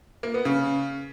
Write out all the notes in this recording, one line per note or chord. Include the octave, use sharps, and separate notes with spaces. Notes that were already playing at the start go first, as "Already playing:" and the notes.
A#3
B3
C#3